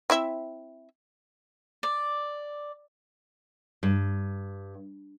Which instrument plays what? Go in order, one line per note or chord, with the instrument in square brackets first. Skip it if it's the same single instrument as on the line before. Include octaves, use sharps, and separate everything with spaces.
[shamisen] C4 E4 E5
[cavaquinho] D5
[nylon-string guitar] G2